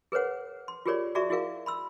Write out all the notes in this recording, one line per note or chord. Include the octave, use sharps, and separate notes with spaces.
G#4 A#4 B4 C#5 F#5
C6
F4 G4 G#4 A#4 C#5 D5
F#4 G#4 D5 E5 A#5 C#6
E4 F#4 G#4 A#4 F5
B5 C6 E6